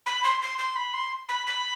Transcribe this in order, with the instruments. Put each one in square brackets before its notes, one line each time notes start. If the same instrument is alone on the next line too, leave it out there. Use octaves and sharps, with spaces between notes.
[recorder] B5
C6
C6
C6
B5
C6
B5
B5